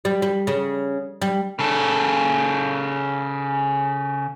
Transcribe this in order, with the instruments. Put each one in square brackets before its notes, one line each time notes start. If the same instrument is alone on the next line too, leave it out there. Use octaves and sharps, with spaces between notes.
[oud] G3
G3
C#3
G3
[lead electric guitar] C#3 A4